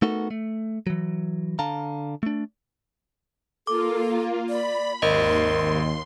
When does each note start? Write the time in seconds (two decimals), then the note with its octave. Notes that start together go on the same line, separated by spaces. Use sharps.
0.02 A3 B3 D#4 F#4 A4 A#4
0.31 A3
0.87 E3 F#3
1.59 D3 F5 A5 A#5
2.23 A3 D4
3.67 A#3 F4 A4 D6
4.49 D5 B5
5.02 G#1 D#2 A#4 D#5 C6